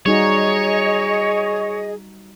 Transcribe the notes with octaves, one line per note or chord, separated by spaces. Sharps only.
G3 D#4 F#4 G#4 C#5 D#5